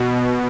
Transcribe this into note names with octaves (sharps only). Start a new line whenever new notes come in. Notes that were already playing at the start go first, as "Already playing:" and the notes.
Already playing: B2